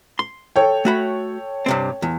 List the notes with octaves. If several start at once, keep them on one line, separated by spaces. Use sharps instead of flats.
C6
A4 C#5 G5
A3 F#4 B5
G2 C3 C4
E2